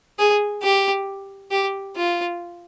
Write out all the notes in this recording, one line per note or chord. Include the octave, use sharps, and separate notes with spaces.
G#4
G4
G4
F4